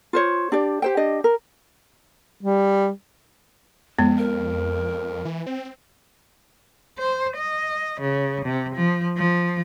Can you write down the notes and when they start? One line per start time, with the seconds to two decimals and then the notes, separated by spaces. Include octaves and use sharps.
0.13 F4 C5 C#5
0.52 D4 G4 D5
0.82 G4 C5 G5
0.97 D4 G4 D#5
1.24 A#4
2.43 G3
3.99 F2 G#3 B3
4.18 A#4
5.25 E3
5.46 C4
6.98 C5
7.37 D#5
8.00 C#3
8.45 C3
8.75 F3
9.17 F3